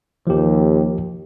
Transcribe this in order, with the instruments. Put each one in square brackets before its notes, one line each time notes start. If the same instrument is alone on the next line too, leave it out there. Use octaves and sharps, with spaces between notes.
[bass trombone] D#2 [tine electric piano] F3 G4